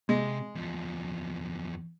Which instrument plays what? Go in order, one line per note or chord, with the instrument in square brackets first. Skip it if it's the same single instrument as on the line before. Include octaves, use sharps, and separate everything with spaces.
[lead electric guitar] C3 [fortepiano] G#3
[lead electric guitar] E2 F3